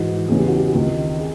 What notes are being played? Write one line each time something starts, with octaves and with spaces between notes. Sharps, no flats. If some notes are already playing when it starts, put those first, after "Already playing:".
Already playing: G#2 E3 F#4
E2 C#3 E3 G#4
G4
F#4
G4
C#2 C3 D#3
G#4